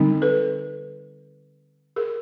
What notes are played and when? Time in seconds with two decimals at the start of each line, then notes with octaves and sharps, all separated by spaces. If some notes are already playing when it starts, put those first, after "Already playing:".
Already playing: D3 G3 C4 D#4
0.22 A4 B4
1.96 G#4 A#4